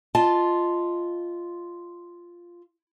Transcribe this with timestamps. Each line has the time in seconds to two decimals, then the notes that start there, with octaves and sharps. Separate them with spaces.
0.15 F4 D#5 A5